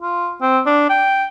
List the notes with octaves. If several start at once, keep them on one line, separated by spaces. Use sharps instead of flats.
F4
C4
D4
G5